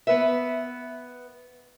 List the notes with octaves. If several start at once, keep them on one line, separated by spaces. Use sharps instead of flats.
B3 B4 E5